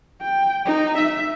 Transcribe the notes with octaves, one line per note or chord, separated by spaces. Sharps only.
G5
D#4
E5